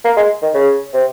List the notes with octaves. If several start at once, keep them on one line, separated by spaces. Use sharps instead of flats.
A#3
G#3
D#3
C#3
C3